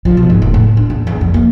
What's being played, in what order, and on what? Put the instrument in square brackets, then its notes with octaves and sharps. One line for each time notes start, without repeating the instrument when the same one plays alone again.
[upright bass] F3
B2
G#2
E1
A2
D4
E2
E2
F2
A#3